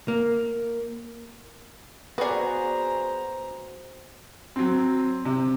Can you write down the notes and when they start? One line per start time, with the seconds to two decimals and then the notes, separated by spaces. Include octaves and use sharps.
0.08 A#3
2.18 B3 F#4 G#4 B4 C5 D5 F#5 A#5
4.56 F#3 C4
5.25 C3